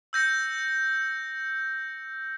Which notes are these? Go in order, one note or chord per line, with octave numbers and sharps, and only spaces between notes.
E6 G6 A#6 C#7